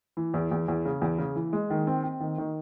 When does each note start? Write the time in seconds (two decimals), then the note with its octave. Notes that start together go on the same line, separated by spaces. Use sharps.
0.17 E3
0.34 E2
0.51 E2
0.68 E2
0.85 C#3
1.01 E2
1.19 C#3
1.36 E3
1.53 G#3
1.70 D#3
1.87 C4
2.04 C4
2.20 D#3
2.38 D#3